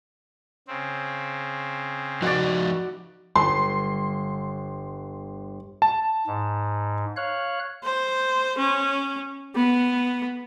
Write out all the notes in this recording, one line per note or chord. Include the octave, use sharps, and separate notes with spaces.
C#3 C4
F3 D#4 F#4 D5 D#5
G1 C6
A5
G#2
C#5 F5 F#6
C5
C#4
B3